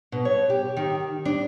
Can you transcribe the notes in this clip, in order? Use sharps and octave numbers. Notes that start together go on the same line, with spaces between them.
B2
C#5
G4
D#3
D4